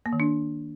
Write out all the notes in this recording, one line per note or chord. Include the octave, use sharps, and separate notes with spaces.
A#3
D#3
D4